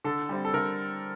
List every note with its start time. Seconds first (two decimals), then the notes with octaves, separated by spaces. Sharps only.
0.04 D3 A4
0.29 G3 C4
0.45 A4
0.54 D3 A#4